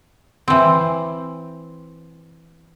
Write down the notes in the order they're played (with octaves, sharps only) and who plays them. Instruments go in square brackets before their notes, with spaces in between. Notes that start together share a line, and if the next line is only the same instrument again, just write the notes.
[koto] E3 C4